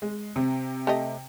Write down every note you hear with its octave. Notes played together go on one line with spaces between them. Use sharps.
G#3
C3
A3 G4 D#5